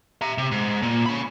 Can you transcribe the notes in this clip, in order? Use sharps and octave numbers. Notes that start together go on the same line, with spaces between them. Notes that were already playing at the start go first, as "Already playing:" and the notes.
E5 A#5
C3
G#2
A#2
C#4 B5